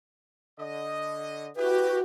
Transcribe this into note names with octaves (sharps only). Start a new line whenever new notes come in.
D3 D#5
E4 F#4 G4 B4